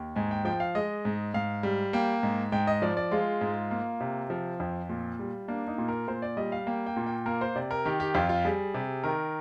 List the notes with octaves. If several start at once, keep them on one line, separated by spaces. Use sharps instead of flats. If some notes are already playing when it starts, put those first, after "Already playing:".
Already playing: D#2
G#2 G#5
G5
F3 G5
F5
G#3 D#5
G#2
G#2 F5
G3
A#3 G5
G#2
G#2 G5
D#5
F3 D5
D5
G#3 F4
G#2
A#3
C3
F3
F2
A#2
G3
A#3 D4
D#4
A#2
A#4
A#2 C5
D5
G3 D#5
F5
A#3 G5
G5
A#2
G5
A#3 A#4
C5
C3 D5
A#4
D#3 G4
G4
F2 F4
F4
G3 G#4
C3
D#3 A#4